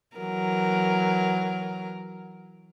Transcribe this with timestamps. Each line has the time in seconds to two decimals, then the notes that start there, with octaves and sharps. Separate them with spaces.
0.17 E3 F#3 A#4